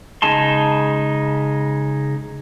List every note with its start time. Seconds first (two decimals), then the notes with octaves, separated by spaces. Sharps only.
0.22 C#3 G#3 D#4 A5 C6